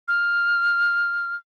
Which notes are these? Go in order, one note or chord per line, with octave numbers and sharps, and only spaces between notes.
F6